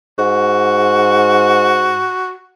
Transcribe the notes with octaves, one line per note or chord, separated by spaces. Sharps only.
G#2 F#4